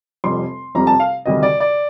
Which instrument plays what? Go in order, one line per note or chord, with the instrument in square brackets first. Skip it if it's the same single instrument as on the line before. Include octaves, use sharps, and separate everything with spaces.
[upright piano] F1 F2 C3 G3 C6
F1 F2 C3 G3 A#5
A5
F5
D2 C3 D#3 G3 D#5
D5
D5